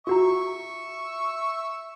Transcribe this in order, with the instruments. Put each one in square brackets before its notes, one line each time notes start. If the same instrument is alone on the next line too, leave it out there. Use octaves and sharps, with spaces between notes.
[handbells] F4 F#4 A#5 [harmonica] E5 C#6